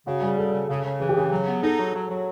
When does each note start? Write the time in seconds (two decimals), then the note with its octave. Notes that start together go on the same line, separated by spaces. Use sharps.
0.07 C#3 F#4
0.22 G3 G#4
0.38 C#3 A4
0.53 C#3
0.69 C#3
0.84 C#3
1.00 E3 G#4
1.09 G4
1.16 C#3 G#4
1.31 F#3
1.47 B3
1.63 D#4 A4
1.79 F#3
1.94 F#3
2.09 F#3